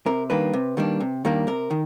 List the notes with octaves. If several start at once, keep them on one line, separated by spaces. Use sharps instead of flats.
C3 A#4
D#3 G3 A#3 D4 B4
C3
D#3 G3 A#3 D4
C3
D#3 G3 A#3 D4
C3 A#4
D#3